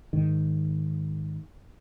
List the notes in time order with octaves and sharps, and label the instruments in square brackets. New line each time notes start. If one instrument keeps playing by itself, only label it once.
[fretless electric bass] G#2 D#3